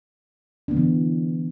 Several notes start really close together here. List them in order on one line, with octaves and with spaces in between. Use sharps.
D4 B3 D3 E3